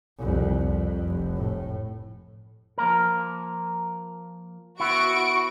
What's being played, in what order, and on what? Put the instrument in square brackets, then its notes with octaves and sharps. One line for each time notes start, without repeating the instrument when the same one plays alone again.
[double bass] C2 F2
F2
F1
A2
[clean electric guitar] F3 A#3 A#4
[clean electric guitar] B3 E4 [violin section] F#4 C#6 D7